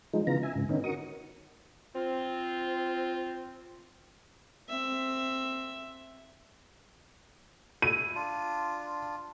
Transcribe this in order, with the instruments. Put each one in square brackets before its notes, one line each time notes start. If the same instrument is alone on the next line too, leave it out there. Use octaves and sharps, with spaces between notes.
[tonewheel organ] F3 G#3 D#4
C#3 E3 B3 F4 A#5
E5 G#5
G#2 C#3
D3 D#3 B3 C#4 D#4
F#4 A#4 C#6 D#6
[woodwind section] C4 F4
[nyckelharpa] C4 E5
[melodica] E4 [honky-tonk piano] D#7
[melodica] D4 F4